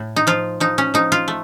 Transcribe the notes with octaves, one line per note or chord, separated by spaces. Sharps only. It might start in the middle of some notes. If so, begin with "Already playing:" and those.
Already playing: A2
D#4
F3 F4
F3 D#4
C#4
F3 D#4
F4
A3